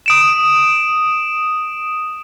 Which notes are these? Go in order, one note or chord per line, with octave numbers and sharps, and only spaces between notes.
D#6 D7 E7